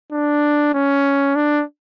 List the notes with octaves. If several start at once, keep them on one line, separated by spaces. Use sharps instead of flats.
D4
C#4
D4